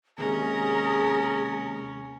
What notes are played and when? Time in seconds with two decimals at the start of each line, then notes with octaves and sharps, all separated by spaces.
0.18 D#2 C3 G#3 C#4 G#4 A#4